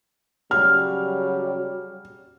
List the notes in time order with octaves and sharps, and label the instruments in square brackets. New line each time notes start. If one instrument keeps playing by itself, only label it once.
[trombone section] C#3 F#3 G3 [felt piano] F6